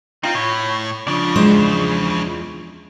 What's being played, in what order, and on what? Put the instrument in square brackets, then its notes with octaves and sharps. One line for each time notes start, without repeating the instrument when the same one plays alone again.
[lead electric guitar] C4 [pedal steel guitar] D#4 F4
[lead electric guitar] A2 [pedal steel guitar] C#5
[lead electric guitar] C#2 C#3 [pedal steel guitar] F3 D4 D5
[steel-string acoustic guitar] E2 G#3 C5